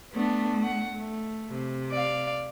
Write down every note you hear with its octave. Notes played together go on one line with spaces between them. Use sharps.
A3 B3 D4
F#5
A3
C3
D5 F5